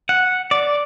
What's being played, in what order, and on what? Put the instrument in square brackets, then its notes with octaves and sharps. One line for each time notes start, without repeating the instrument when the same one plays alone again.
[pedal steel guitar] F#5
D5